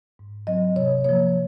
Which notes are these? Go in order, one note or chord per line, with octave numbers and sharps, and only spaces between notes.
G#2
F#3 C4 D#5
C3 C#5
F3 A#3 C#5